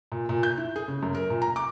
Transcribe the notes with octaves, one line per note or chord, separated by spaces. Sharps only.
A#2
A#2
G6
E4
G#4
C#3
F#2
A#4
A#2
A#5
D6